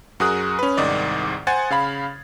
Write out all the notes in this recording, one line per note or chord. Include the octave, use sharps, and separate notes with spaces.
F#2 F#4 G#4 A#4 D#6 F#6
C#4 B4
C2 G#2 D#3 D5 D#5
C5 F#5 G#5 G#6 A6
C#3 F5 B5